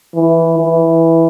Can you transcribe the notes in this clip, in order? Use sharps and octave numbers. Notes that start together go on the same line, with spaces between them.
E3
E3